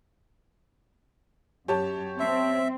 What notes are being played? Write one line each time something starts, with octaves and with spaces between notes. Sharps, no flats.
F#2 G4 C#5 A5
C4 E5